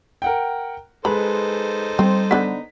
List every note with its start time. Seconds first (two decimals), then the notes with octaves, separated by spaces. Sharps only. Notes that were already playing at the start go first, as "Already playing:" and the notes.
0.22 A#4 F#5 G5
1.05 G#3 D#4 A4 B4 C5 B5
1.99 G3 C4
2.31 D3 B3 B6